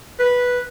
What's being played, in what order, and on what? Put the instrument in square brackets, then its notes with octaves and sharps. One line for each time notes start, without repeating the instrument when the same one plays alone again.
[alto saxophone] B4